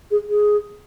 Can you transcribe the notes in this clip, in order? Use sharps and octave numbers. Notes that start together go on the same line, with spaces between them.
G#4
G#4